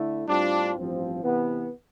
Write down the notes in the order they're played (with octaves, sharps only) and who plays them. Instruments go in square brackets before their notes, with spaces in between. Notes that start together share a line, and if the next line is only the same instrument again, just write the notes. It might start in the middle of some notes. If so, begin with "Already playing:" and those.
Already playing: [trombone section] D3 A3 E4
[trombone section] A2 G3 C4 F4 [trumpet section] D4
[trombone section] A1 G2 F3 C4
C3 E3 B3